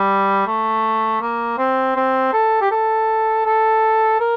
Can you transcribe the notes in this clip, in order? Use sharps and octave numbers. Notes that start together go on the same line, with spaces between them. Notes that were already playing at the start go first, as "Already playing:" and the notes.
Already playing: G3
A3
A#3
C4
C4
A4
G4
A4
A4
A#4